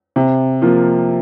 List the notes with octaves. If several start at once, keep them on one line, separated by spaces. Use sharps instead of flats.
C3
F3 A#3 F4